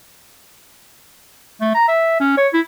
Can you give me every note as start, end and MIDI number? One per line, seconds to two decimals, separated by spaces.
1.61 1.74 57
1.75 1.86 82
1.88 2.20 76
2.20 2.37 61
2.37 2.48 73
2.53 2.61 64